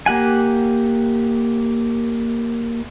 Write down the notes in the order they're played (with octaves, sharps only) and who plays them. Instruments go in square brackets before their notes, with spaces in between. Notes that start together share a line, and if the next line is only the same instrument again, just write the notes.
[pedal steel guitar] A#3 G4 F#5 G#5